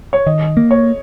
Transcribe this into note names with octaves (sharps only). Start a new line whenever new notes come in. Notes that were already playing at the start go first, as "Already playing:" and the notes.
C#5
D#3 D#5
A#3
C#5